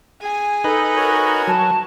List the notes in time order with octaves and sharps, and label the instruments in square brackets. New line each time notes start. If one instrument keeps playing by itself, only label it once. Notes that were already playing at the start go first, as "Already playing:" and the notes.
[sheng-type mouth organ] G#4 [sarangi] G#5
[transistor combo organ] D#4 B4 [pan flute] A4
[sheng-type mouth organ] F#4 A#4 C#5
[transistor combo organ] F#3 [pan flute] A5